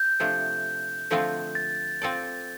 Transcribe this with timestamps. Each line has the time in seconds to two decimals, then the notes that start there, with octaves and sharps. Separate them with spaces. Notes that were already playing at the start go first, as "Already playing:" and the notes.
Already playing: G6
0.20 C3 F3 A3 D4
1.10 D3 F3 A3 C4 F4
1.55 A6
2.02 C4 F4 A4 D5